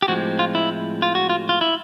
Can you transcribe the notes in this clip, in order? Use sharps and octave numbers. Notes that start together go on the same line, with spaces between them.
G4
A2 F3 G#3 C4 F#4
F4
E4
F4
F#4
F4
F4
E4